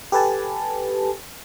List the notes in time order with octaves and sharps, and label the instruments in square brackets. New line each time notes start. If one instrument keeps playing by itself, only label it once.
[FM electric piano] G4 A4 B4 G#5 A5